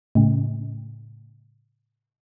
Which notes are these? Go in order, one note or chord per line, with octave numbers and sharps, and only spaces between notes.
A2 C#3